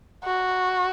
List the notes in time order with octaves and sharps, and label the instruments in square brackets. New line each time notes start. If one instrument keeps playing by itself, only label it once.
[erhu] F#4